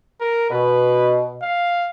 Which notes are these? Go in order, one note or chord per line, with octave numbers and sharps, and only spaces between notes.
A#4
B2 B4
F5